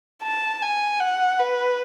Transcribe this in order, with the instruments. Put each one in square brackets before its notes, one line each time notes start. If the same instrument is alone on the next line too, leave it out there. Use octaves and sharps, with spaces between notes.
[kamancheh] A5
G#5
F#5
B4